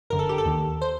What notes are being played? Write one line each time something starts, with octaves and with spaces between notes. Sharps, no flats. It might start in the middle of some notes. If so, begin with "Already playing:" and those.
G1 F#2 D3 A#4
A4
G4
A4
D#2 D#3
C5